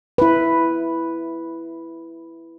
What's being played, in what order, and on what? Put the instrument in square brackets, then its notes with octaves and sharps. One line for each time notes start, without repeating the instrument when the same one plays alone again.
[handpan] E4 B4